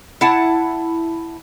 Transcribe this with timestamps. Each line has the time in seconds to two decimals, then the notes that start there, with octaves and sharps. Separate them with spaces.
0.21 E4 F#5 A5